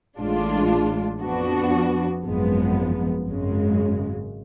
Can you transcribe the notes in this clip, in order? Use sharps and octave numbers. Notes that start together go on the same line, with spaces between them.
A1 A2 G#3 D4 F4
F2 F3 B3 D4 F#4
G#1 F#2 F3 G#3 B3
G#1 F#2 C#3 G#3